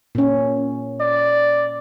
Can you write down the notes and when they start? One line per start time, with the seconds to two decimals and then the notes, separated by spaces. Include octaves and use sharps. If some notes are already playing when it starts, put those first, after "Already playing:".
0.15 A#2 C#4
1.00 D5